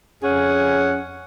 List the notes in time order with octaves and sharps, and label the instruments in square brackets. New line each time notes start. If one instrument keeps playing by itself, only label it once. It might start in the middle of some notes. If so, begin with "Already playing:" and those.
[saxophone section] F2 C#4 G#4 F#5